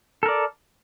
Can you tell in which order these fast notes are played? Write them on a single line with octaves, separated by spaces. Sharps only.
A4 A#4 D5